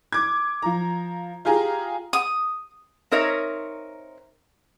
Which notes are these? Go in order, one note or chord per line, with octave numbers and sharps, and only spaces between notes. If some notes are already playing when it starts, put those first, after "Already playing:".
D6 G#6
F3 A#5
F4 G4 G#4 A#5
D#6
C4 D#4 A#4 C#5 E5